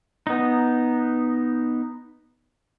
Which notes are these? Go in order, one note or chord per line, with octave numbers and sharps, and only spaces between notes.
B3 D#4